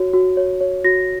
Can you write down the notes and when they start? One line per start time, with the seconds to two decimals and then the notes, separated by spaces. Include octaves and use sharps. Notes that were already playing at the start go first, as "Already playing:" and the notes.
Already playing: F#4 C#5
0.14 F#4
0.37 C#5
0.61 C#5
0.84 F#4 A#6